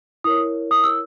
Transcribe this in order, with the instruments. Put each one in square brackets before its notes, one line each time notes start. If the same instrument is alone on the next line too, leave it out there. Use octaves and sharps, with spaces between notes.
[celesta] E4 A#4 C#5 D#6
D#6
E6